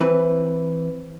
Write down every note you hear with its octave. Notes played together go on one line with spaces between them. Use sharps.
E3 C4 B4